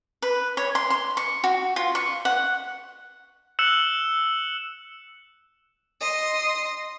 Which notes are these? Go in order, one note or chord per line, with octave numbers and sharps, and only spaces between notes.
B4
C#5
C6
C6
C#6
F#4
F4
C#6
F#5
E6 F#6 C#7 E7 F#7
D#5 C6